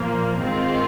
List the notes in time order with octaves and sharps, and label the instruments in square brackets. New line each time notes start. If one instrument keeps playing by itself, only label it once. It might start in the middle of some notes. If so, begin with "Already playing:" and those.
Already playing: [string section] A#2 F3 A#3
G#2 D#3 G#3 C4 F4